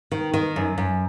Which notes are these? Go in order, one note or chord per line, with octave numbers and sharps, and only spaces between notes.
D#3
D#3
F#2
F#2